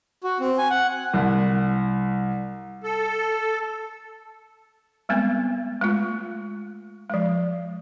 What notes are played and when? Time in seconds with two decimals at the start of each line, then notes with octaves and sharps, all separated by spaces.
0.24 F#4
0.40 C4
0.58 G#5
0.70 F#5
1.14 C2
2.84 A4
5.09 G3 G#3 B3 C4
5.81 G#3 A3 F4
7.10 F3 G#3